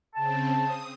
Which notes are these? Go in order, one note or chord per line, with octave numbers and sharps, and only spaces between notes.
C#3 C4 A5
D#6